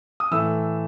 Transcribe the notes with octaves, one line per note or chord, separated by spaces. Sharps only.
D#6
A2 E3 A3 E6